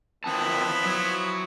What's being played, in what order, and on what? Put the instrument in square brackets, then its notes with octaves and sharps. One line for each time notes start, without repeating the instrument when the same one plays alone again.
[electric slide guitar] D#3 C4 A5 [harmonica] F3 B3 E4
[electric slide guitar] F#3